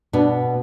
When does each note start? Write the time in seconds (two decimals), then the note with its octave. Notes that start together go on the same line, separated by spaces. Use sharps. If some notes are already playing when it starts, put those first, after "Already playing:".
0.13 B2 B3 D4